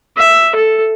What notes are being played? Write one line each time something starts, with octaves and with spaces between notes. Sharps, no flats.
E5
A4